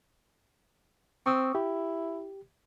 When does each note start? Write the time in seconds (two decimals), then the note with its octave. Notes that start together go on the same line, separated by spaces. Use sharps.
1.26 C4 C#6 D#6 E6
1.55 E4 G4